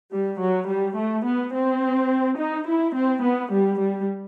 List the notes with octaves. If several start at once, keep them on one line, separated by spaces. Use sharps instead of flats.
G3
F#3
G3
A3
B3
C4
D#4
E4
C4
B3
G3
G3